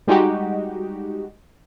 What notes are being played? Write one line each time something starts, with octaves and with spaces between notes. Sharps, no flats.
G3 G#3 D#4 F#4 G4